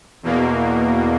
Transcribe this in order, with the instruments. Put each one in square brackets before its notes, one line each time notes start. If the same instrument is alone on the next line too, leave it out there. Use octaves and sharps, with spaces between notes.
[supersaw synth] E2 B2 A#3